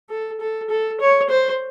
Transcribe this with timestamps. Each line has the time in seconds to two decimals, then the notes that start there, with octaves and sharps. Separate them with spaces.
0.10 A4
0.41 A4
0.70 A4
1.00 C#5
1.29 C5